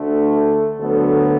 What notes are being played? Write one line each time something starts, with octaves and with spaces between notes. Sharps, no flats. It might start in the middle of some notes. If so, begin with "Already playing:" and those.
Already playing: D2 D3 A3
A4
D2 D3 F#3 B3 A4